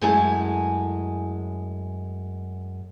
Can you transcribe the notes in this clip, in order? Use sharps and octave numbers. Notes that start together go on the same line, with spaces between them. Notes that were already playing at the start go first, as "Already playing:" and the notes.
F#2 G#3 A3 E4 G#4 A5